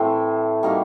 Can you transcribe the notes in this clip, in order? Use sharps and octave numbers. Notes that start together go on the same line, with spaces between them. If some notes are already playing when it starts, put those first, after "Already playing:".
Already playing: A2 E3 A3 C4
G3 A#3 D#4 F#4